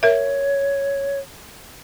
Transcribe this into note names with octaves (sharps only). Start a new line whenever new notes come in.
A#4 C#5 E5